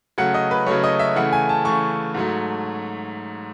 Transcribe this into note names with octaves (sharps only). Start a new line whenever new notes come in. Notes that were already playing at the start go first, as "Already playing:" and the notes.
C#3 F#3 A3 F#5
D#5
B4
C#3 F#3 A3 C#5
D#5
E5
C#3 E3 A3 F#5
G#5
A5
C#3 E3 A3 C#6
G#2 F#3 A3